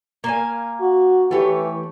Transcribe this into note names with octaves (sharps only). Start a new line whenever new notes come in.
A#3 F5 G#5
F#4
E3 A3 G4 C#5